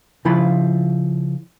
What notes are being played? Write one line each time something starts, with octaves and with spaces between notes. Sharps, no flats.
C#3 F3 E4 F4 B5